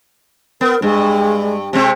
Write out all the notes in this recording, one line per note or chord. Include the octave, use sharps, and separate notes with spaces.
B3 A#4
G2 G#3
C3 G#3 C4